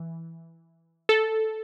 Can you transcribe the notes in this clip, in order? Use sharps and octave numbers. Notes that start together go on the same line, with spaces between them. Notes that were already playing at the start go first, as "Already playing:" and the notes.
Already playing: E3
A4